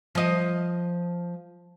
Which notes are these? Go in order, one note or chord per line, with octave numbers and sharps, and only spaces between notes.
F3 D#5